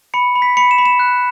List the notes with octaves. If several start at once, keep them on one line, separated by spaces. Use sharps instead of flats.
B5 C#7
B5
B6
B5 C#7
E7
B5
E7
F#6